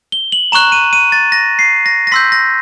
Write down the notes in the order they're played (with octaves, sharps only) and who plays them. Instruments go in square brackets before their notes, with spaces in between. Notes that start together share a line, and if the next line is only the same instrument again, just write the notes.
[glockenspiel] G7
F#7
A#5 C#6 F#6 E7
D#7
D#7
A6
A#6
C7
A#6
A#6
C6 E6 G6 B6
A#6